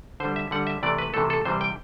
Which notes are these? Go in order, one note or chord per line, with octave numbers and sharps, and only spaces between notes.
D3 G3 C5
E5
D3 G3 F#5
E5
C3 E3 A3 D5
B4
C3 E3 A3 A4
A4
C3 E3 G3 C5
G5